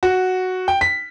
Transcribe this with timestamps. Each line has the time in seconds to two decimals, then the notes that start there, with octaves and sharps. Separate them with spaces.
0.03 F#4
0.68 G5
0.81 B6